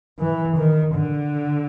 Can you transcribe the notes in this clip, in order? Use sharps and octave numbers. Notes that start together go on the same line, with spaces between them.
E3
D#3
D3